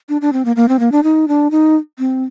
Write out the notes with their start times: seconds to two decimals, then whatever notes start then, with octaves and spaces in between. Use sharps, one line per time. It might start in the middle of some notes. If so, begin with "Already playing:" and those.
0.09 D4
0.21 D4
0.33 C4
0.45 A#3
0.56 A#3
0.69 C4
0.80 A#3
0.92 D4
1.03 D#4
1.28 D4
1.51 D#4
1.99 C4